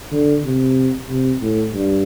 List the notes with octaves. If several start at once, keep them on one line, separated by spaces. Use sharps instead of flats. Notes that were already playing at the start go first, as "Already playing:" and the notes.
D3
C3
C3
A2
G2